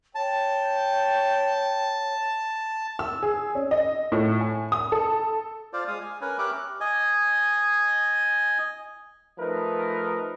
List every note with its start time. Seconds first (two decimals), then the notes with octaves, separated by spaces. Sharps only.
0.15 C#5 G5 A5
2.99 E6
3.22 G#4
3.55 C#4
3.71 D#5
4.12 A2
4.41 G#5
4.72 D#6
4.92 A4
5.73 F4 C5 D5
5.88 G#3 F5 D#6
6.01 G#5
6.21 C#4 A#4 B4 C#5 G#5
6.39 G4 A#4 C#5 E5 D6 F#6
6.80 D#5 G#5
9.38 F3 A3 D#4 A#4 B4